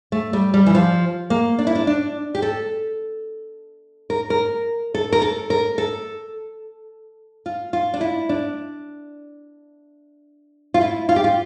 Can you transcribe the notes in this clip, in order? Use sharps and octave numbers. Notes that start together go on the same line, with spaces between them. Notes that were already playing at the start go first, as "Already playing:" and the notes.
A3
G3
G3
E3
F3
A#3
D4
E4
D4
D4
G4
A4
A#4
A#4
A4
A#4
A4
A#4
A4
F4
F4
D4
E4
D4
F4
E4
F4
G4
F4